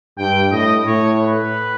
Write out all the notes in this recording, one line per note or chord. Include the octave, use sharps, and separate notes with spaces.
G2 G5
A2 D#5
A2 C#5
B4